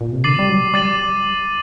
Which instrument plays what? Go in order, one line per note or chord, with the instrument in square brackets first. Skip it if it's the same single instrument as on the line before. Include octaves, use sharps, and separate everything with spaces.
[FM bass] A#2
C3
[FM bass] D3 [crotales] D6 A6 C7 D#7 F#7
[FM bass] G3
F#3
[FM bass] G3 [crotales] D6 A6 C7 D#7 F#7